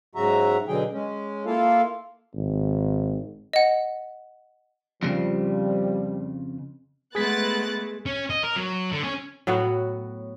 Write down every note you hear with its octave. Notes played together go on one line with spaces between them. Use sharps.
G#2 C#3 F#3 F#4 E5 A#5
B2 D3 F#3 G#4 G5
G#3 C#4
A#3 E4 F4 A4 F5
G#1
D#5 F#5
F2 A#2 C#3 F3 G3
G#3 A3 B3 G#4 F#6 G#6 A6 B6
C#4
D#5
A#4
F#3
D3
C#4
A2 F#3 B3 F#4